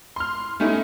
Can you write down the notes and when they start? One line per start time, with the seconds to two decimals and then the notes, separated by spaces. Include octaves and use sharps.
0.16 C6 F6
0.60 A3 C#4 D#4 E4